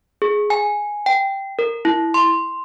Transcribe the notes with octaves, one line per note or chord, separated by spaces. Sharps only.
G#4
G#5
G5
A#4
E4
C6